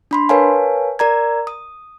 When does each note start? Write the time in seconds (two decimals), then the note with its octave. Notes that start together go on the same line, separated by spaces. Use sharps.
0.11 D4 B5 C6
0.29 A#4 B4 C#5 F5 G#5 A5
0.99 A#4 D5 A#5 G#6
1.47 D#6